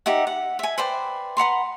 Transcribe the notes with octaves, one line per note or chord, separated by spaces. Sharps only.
D#4 G4 E5 F#5
F#5
E5 G#5
B4 C5 D5 G5
B4 F#5 A#5 C6